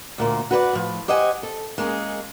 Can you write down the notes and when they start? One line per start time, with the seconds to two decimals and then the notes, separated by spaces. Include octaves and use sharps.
0.18 D2 A#2 A#3
0.51 F#4 B4 C5 D5
0.73 A2 F3
1.08 G4 C5 D#5 F#5 G#5
1.43 A4
1.78 G#3 A#3 C#4 G#4